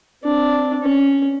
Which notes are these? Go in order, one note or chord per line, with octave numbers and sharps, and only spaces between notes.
C4 D4
C#4